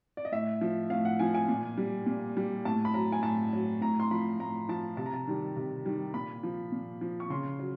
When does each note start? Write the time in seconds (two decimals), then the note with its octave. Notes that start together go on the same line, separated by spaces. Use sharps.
0.17 D5
0.25 D#5
0.32 A2 E5
0.61 F3
0.90 A2 F5
1.05 F#5
1.19 F3 G#5
1.34 G#5
1.48 A#2
1.77 G3
2.06 A#2
2.37 G3
2.65 A2 A5
2.85 B5
2.94 F#3 A#5
3.12 G#5
3.23 A2 A5
3.53 F#3
3.81 A2 A#5
4.00 C6
4.11 F3 B5
4.39 A2 A#5
4.69 F3 A5
4.97 C3 A5
5.06 A#5
5.14 A5
5.27 D#3 G3
5.57 C3
5.86 D#3 G3
6.14 A#2 B5
6.43 F3
6.72 A#2
7.01 F3
7.20 C#6
7.30 C#3 C6
7.59 F#3